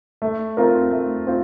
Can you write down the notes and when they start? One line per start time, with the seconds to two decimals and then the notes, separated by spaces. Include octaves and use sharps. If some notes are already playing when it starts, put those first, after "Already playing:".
0.22 A3
0.57 C4 F4 A#4
0.91 A3
1.27 C4 F4